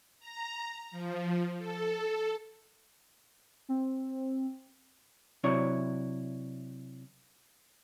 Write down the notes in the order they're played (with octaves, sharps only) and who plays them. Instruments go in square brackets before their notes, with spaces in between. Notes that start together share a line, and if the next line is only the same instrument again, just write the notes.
[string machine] A#5
F3
A4
[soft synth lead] C4
[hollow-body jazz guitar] C3 F#3 D4 E4 C#5